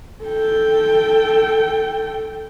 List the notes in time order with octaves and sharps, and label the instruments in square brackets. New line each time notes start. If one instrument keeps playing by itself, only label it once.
[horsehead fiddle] A4 G5